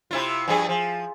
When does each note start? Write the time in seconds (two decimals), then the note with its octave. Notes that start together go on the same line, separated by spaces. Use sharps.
0.11 C3 E4 F4
0.48 G2 F3 G#4
0.69 F3